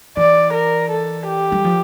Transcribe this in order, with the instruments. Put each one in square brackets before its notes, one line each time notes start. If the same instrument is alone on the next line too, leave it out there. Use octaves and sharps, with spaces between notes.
[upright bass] E3 [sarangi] D5
[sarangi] A#4
A4
G4
[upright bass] G3
F3